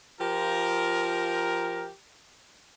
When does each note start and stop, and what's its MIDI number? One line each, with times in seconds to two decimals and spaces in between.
0.19 1.89 53
0.19 1.89 65
0.19 1.89 67
0.19 1.89 70